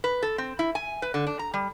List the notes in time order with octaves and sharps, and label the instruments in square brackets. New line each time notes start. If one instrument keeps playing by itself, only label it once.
[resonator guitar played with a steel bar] B4
A4
C4
E4
G#5
B4
D3
D4
A#5
G3